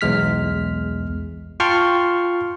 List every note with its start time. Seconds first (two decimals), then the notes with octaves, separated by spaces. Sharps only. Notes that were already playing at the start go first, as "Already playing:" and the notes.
0.01 B1 E2 G#3 F6 B6
1.60 F4 G5 A5 C6 C#6 F6